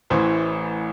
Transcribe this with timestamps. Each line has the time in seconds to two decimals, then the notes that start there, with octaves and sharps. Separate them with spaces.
0.10 A1 A2 E3 C5